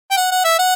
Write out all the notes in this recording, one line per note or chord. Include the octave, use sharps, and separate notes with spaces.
G5
F#5
F#5
E5
F#5